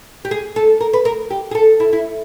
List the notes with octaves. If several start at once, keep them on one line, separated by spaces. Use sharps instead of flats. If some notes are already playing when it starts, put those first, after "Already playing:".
G4
G#4
A4
A#4
B4
A#4
G4
G#4
A4
E4
E4